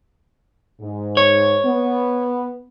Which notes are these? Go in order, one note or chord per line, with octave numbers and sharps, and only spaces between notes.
G#2
C#5
B3